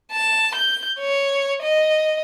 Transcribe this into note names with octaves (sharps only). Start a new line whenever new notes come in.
A5
G6
C#5
D#5